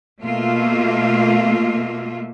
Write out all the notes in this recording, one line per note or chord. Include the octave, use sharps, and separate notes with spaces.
B2 A3 A#3 F4 E5